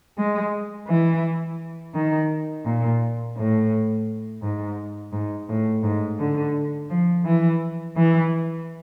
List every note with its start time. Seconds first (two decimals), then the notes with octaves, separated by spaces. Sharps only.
0.18 G#3
0.88 E3
1.94 D#3
2.65 A#2
3.37 A2
4.42 G#2
5.13 G#2
5.49 A2
5.83 G#2
6.20 D3
6.90 F3
7.25 E3
7.96 E3